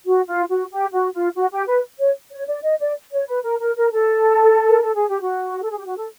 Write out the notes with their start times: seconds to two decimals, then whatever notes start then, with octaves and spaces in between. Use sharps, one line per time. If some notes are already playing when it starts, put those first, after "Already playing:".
0.06 F#4
0.28 F4
0.49 F#4
0.71 G4
0.92 F#4
1.13 F4
1.35 F#4
1.51 G4
1.67 B4
1.99 C#5
2.32 C#5
2.48 D5
2.63 D#5
2.80 D5
3.12 C#5
3.28 B4
3.44 A#4
3.60 A#4
3.76 A#4
3.92 A4
4.68 A#4
4.82 A4
4.95 G#4
5.08 G4
5.21 F#4
5.62 A4
5.70 G#4
5.78 G4
5.85 F#4
5.97 A4